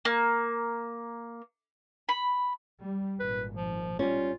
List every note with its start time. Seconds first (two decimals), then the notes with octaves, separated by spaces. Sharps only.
0.05 A#3
2.09 B5
2.82 G3
3.20 G#1 A#2 B4
3.56 F3
3.99 G3 C#4 F4